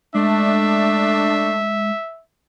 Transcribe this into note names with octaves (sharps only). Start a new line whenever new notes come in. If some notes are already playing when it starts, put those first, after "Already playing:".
G#3 A3 D4 E5